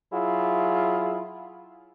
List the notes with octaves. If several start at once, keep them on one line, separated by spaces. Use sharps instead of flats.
F#3 E4 F4 G#4